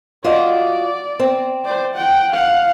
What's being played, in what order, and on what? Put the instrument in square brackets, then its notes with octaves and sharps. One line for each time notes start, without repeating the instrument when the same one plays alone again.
[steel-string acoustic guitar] F4 F#4 D#5 [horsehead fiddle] D5
[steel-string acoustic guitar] C4
[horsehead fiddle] C5 D5
F#5 G5
F5 F#5